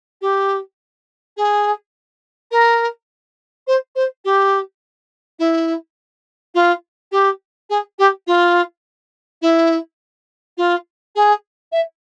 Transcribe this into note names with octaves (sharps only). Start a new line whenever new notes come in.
G4
G#4
A#4
C5
C5
G4
E4
F4
G4
G#4
G4
F4
E4
F4
G#4
E5